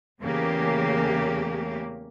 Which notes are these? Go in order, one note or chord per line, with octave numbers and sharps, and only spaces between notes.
E2 C#3 A3 A#3 G4